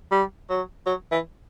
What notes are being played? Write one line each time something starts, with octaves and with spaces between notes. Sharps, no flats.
G3
F#3
F#3
E3